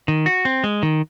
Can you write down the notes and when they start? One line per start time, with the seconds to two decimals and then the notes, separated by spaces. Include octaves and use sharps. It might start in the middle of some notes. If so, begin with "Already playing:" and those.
0.08 D#3
0.26 F#4
0.45 C4
0.64 G#3
0.83 D#3